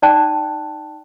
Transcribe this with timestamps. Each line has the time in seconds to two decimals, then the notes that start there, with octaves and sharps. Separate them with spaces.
0.02 D#4 D5 G5 A5 F#6